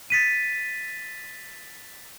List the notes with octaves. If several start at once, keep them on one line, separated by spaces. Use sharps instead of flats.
A6 B6 D#7